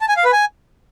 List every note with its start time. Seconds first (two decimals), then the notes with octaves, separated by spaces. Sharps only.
0.01 A5
0.09 G#5
0.17 F5
0.25 B4
0.32 G#5